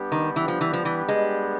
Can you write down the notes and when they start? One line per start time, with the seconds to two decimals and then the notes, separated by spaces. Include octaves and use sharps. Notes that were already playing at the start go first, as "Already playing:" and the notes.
Already playing: G3 B3 D4 G4
0.12 D#3
0.36 E3
0.48 F3
0.61 E3
0.73 F3
0.85 E3
1.08 G#3